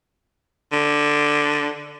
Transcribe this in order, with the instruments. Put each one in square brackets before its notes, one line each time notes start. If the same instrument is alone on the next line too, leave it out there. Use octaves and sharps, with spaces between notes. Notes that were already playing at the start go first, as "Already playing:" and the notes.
[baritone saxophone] D3